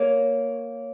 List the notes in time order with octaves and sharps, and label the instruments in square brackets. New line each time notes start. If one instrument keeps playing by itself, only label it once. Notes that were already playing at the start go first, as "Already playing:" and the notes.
Already playing: [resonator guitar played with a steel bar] A#3 [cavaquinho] C#5